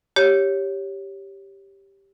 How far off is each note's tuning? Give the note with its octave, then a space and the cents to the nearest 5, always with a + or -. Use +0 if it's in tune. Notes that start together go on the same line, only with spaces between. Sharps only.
G4 +0 C#5 +0